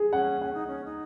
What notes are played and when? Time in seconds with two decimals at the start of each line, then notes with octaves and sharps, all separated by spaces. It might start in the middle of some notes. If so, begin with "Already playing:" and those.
Already playing: G#4
0.12 C#4 F#5
0.41 C#4 F#5
0.54 D#4
0.67 C#4
0.85 D#4